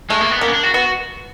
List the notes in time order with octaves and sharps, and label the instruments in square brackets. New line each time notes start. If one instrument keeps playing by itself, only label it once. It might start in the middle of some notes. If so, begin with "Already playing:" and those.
[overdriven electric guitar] G#3 [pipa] A3
[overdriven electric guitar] A#3
B3
[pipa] A#3 [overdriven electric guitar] B3
[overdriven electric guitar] C#4
D4
F#4
[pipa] B3 [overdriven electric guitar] F#4